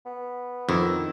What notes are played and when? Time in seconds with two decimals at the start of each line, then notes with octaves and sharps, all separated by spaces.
0.06 B3
0.69 F2 D#3 E4